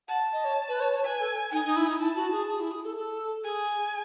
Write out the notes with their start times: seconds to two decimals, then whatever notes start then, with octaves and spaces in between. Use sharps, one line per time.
0.08 F#5 A5
0.33 D#5
0.44 C#5
0.69 B4
0.80 C#5
0.92 C#5
1.04 B4 G#5
1.20 A4
1.52 D#4 G#5
1.65 D#4
1.76 E4
1.88 D#4
2.00 E4 A5
2.16 F#4
2.32 G#4
2.48 G#4
2.60 E4
2.72 G#4
2.84 A4
2.97 A4
3.44 G#4 G#5